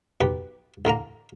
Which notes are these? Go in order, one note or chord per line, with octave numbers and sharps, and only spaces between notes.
B1 G4 B4
A1 D3 A#3 A#5